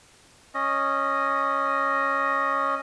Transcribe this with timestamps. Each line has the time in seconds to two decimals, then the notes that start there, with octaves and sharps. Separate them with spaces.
0.55 C#4 D#5